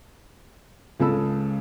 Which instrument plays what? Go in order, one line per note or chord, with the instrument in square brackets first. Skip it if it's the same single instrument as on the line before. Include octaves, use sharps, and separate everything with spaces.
[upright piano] C#2 C#3 G#3 A4 B5 E6